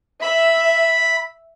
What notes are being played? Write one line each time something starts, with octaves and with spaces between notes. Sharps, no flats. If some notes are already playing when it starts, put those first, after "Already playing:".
E5 B5